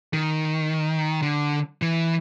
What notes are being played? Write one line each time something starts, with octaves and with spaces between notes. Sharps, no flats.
D#3
D3
E3